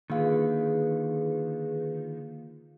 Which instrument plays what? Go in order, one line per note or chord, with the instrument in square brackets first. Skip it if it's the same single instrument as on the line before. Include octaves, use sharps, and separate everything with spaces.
[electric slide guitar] D3 D#3 [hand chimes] A#3 F5 [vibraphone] F4 G#4 B4